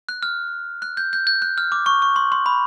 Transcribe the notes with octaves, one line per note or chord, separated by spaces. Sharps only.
F#6
F6
F#6
G6
G6
G6
F#6
F6
D6
C#6
C#6
C6
C6
B5